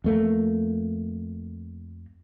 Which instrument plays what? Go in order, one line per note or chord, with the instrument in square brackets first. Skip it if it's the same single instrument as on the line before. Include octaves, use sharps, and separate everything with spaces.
[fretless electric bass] F2 A3 A#3